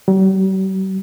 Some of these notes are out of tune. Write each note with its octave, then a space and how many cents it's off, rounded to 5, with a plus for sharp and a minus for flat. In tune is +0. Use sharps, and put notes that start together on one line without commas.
G3 -45